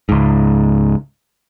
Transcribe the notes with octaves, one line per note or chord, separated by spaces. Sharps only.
C#2 G#2